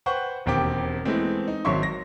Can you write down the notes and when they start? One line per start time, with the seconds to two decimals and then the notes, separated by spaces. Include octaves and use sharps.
0.06 B4 C5 F#5 G5 C#6
0.46 E1 D#2 C4 G4 G5 D6
1.05 E3 G#3 A3 B3 C4
1.48 D#4
1.65 G#1 F#3 C#5 E5 C6 C#6
1.83 A#6